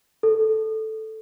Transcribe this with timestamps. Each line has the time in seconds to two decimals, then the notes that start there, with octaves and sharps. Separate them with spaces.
0.23 A4